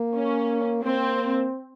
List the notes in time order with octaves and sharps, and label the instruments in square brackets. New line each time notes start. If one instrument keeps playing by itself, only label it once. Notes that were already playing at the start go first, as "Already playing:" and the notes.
Already playing: [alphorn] A#3
[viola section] C#4
[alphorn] A#3 [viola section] C4